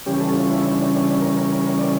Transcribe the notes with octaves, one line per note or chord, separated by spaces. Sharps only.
C#3 E3 G3 C#4 G4
A4
F4
E4
D4
D4
A#4
D5